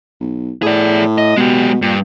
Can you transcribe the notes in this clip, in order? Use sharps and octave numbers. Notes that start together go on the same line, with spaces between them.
B1
A2 G#4 D5
D#5
B2 G#3 G4
G2 A#2